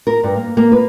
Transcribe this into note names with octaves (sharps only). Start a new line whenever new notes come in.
A#4
G2
A#3
A#3
B4